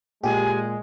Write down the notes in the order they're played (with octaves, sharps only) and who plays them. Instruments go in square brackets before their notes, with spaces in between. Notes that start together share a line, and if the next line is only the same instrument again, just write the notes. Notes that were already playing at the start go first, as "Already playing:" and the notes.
[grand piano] A#2 [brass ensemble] G#3 [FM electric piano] G4 [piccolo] G#5